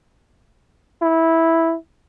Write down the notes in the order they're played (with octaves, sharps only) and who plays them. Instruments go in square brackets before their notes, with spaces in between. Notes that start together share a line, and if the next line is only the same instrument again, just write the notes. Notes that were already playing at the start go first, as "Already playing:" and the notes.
[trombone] E4